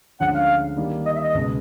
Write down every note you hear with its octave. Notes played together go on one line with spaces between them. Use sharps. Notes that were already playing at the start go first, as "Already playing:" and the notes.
D2 D3 F3 G#3 C#4 F#5
F5
D#3 G3 A#3
D#5
E5
D#5
C#2 B2 G#3